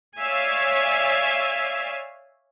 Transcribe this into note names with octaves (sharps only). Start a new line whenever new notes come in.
C#5 D5 E5 F5 G#5